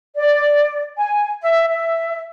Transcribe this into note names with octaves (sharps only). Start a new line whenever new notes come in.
D5
G#5
E5
E5